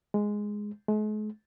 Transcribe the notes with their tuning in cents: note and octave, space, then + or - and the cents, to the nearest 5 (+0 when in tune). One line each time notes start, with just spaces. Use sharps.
G#3 +0
G#3 +45